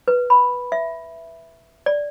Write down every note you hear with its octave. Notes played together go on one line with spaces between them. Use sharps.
B4
B5
E5
D5